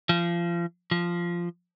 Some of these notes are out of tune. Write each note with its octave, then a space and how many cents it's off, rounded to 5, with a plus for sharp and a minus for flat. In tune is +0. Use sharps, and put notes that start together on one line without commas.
F3 -30
F3 -10